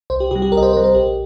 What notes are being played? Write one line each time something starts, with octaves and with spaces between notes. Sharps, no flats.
C2 C5
G4
C3 G3 G4
G4
C2 A#4
D#5
C5
C3 G3 C5
A#4
A#1 G4